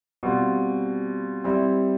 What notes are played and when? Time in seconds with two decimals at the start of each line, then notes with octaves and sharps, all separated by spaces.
0.23 B2 G3 C4 F4
1.44 G3 C4 E4